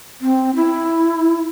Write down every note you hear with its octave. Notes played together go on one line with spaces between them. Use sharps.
C4
E4